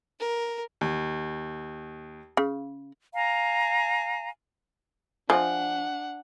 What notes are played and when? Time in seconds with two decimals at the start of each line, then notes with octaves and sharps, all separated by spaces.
0.20 A#4
0.81 D#2
2.37 C#3
3.14 F5 G#5 A#5
5.30 F3 D4 E5 F#5 G#5